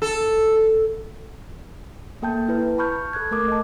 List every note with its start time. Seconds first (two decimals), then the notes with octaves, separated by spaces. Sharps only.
0.02 A4
2.22 A#3 A4 G5 A5 G6
2.48 E4 B4
2.78 A5 B5 C#6 F6 G6
3.13 A4 F#6 G#6
3.31 A3 A#4 D6 D#6
3.48 D#5 A5